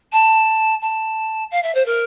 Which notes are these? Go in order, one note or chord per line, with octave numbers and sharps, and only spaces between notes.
A5
A5
F5
E5
C5
A#4